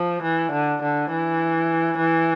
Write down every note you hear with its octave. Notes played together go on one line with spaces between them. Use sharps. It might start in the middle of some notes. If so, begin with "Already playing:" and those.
Already playing: F3
E3
D3
D3
E3
E3